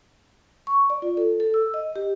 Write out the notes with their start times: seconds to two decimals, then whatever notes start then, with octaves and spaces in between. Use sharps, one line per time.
0.67 C#6
0.90 D5
1.02 F4
1.17 A4
1.40 A4
1.54 E6
1.74 D#5
1.96 G4